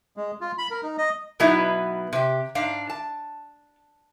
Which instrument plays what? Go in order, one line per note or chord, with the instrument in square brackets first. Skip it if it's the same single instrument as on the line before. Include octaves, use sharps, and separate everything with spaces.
[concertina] G#3
F4
B5
A#4
D#4
D#5
[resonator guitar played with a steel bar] B2 F#3 B3 D#4 E4 B4
C3 G4
G#2 D4 F5
A5